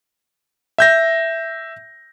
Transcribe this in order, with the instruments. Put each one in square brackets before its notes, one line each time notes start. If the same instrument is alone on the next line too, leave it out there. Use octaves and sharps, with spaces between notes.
[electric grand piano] E5 G6 A#6